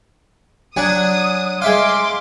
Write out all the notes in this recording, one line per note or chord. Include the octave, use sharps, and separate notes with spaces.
F#3 D4 G#5 D#6
G#3 E5 F5 C6 D6